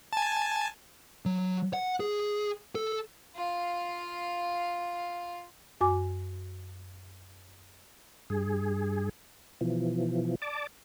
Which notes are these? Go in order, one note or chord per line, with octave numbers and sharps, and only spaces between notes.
G#5 A5
F#3
F#5
G#4
A4
F4 F5
F#2 F#4 G#5 D6
G2 G#4
B2 E3 F3
D5 A5 D6